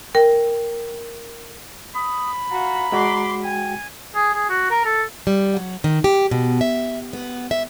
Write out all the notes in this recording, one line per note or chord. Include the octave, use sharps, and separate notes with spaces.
A#4 G5
B5 D#6
F4 F#4 A#5
G#3 F#4 C6 D6
G5 G#5
G#4
G#4
F#4
A#4
A4
G3
F#3
D#3
G4
B2
E5
B3
E5